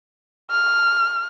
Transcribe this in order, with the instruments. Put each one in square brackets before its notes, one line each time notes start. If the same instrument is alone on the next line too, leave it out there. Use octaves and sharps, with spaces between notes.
[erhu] F6